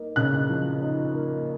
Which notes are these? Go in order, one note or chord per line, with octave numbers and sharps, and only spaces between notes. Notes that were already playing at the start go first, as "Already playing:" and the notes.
Already playing: A#3 D#4
C#3 F#6
F3
D#4
A#3